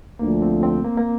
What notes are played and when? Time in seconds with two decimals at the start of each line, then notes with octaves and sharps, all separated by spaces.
0.19 D2 D3 F3 A#3
0.42 C4
0.63 C4
0.85 A#3
0.97 A#3